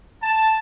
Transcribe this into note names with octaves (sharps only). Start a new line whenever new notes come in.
A5